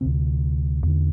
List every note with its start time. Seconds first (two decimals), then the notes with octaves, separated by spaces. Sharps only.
0.01 D2 C3 C4
0.82 E2 D3